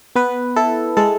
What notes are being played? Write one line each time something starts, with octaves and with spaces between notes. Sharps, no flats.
B3 B4
E4 A4
G#3 A4